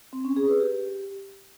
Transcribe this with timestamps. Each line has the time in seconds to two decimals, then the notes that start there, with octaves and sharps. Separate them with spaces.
0.13 C4
0.25 C#4
0.37 G#4
0.48 B4
0.60 G4